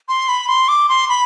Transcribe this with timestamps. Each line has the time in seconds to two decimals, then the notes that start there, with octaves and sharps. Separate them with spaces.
0.08 C6
0.29 B5
0.48 C6
0.68 D6
0.89 C6
1.09 B5